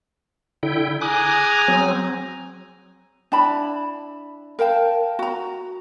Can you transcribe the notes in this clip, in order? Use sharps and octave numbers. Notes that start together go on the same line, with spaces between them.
D3 E4 G5
G#4 G#5 A#5 D6 D#6 F#6
F#3 C4
D4 E4 A5 B5
A#4 F5 G5 A5
F#4 A#5